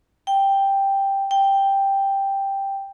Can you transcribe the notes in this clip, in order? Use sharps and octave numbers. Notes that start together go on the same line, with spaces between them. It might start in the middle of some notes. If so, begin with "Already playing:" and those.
G5
G5